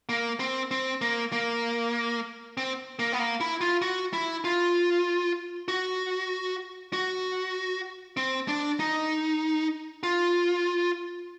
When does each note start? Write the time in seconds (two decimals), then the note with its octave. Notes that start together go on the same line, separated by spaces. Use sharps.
0.09 A#3
0.40 C4
0.71 C4
1.01 A#3
1.32 A#3
2.57 C4
2.99 A#3
3.12 B3
3.19 A#3
3.40 E4
3.61 F4
3.82 F#4
4.13 E4
4.44 F4
5.68 F#4
6.93 F#4
8.17 C4
8.48 D4
8.80 D#4
10.03 F4